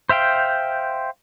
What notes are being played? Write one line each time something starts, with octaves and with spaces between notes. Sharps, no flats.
C5 E5 F5 G5